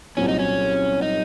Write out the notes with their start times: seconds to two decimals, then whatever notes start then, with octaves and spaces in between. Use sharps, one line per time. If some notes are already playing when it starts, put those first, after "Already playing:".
0.17 C2 A#2 F#3 C4 C#4
0.28 D#4
0.39 C#4
1.02 D#4